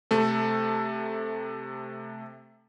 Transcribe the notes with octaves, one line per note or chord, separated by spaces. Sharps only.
C3 A3 A4